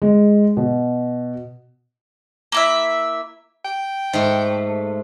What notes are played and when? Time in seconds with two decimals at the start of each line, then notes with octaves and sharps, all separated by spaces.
0.02 G#3
0.57 B2
2.52 A#3 E4 E5
3.65 G5
4.13 G#2 A3